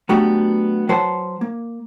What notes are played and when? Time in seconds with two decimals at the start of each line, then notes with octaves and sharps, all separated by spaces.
0.09 F#3 A3 B3 D4 F#4 G4
0.89 F#3 B4 C5 F#5 A5
1.41 A#3